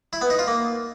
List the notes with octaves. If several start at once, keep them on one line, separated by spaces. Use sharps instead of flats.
E4
B3
D#4
F4
A#3